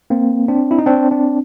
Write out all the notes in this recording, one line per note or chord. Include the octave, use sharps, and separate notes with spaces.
A#3 C4
C4 D4
E4
D#4
C4 D4
C4 D4